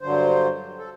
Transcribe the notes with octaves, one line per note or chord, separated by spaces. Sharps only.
G2 D3 F#3 C5
A4